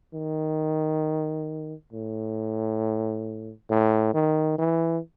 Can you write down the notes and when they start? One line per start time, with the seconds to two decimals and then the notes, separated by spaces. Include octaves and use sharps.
0.14 D#3
1.92 A2
3.70 A2
4.14 D#3
4.58 E3